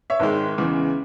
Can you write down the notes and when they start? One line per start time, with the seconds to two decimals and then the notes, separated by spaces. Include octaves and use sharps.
0.10 C#5 E5
0.20 G#1 G#2 D#3 G#3
0.58 E2 C#3 E3 G#3